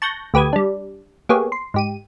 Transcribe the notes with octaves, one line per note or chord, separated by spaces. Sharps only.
A5 C#6 F#6 G6 A#6
D2 G4 B4 D#6 G#6
G3 D4
A#3 B3 G4 G#4 C#5
C6
G#2 G4 D#7